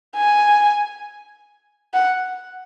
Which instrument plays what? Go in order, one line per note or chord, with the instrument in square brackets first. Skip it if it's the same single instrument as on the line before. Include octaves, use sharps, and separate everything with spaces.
[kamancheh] G#5
F#5